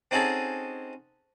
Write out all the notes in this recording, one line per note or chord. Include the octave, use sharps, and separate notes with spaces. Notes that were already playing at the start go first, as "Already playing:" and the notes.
C4 C#4 D#4 F#4 G#4 A4